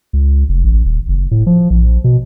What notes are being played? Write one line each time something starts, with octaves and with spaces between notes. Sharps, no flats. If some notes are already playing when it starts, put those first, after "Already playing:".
C#2
F1
A1
D#1
F#1
A2
F3
A#1
B2